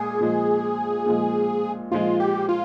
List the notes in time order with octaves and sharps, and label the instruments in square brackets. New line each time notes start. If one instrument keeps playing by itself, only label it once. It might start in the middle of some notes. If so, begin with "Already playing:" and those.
Already playing: [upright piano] A#2 G#3 [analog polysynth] G#4
[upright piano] A#2 F3 G#3
A#2 F3 G#3
[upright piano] A#2 F3 G#3 [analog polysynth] F4
[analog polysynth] G4
F4